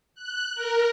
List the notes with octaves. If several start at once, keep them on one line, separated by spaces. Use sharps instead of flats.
F#6
A#4